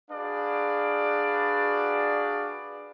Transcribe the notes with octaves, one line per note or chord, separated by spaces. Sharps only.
D4 F#4 G#4 B4 D5 F5